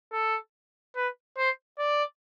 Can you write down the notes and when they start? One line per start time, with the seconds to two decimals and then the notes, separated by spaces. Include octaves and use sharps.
0.13 A4
0.95 B4
1.37 C5
1.79 D5